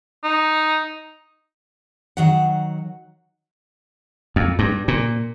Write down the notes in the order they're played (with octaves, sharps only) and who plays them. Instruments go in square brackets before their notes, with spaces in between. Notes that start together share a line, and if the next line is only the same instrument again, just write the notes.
[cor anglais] D#4
[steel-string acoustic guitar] D#3 F#3 F#5
[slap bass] F2
G2
A#2